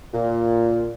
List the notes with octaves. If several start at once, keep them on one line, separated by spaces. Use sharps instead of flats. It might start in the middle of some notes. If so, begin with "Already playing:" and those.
A#2